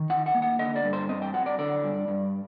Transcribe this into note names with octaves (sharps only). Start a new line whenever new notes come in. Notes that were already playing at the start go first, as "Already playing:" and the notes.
Already playing: D#3
D#4 F#5
F#5
A#3
F#5
D3 D#5
D5
G2
C5
C4 D#5
G5
F#3 F#5
D5
D3 D5
G2
G2